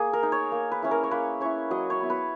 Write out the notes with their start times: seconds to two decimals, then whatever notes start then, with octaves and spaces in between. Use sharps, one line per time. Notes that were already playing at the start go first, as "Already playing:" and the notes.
Already playing: A#3 G#4
0.13 A#4
0.23 D#4
0.32 C#5
0.52 A#3
0.72 B4
0.82 C#4 E4
0.91 A#4
1.04 C#5
1.11 A#3 B4
1.41 C#4 E4 C#5
1.71 F#3 D#5
1.90 C#5
2.00 B3 E4
2.10 B4